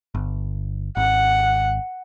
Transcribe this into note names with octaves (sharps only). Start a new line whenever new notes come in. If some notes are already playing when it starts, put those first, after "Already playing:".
G1
G#1 F#5